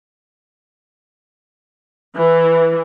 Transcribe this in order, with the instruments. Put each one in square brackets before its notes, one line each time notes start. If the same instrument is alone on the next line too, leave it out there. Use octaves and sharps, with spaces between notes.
[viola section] E3